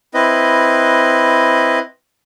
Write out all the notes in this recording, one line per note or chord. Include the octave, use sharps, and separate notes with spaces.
C4 E4 B4 D#5